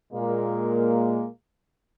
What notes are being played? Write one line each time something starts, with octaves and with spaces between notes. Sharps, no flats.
A#2 G#3 A#3